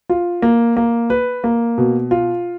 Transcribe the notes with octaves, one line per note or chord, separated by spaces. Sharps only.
F4
A#3
A#3
B4
A#3
B2
F4